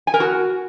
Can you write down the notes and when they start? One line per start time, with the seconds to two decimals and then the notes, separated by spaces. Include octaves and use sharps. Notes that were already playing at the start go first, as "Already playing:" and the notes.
0.07 G#5
0.14 A#4
0.20 F#4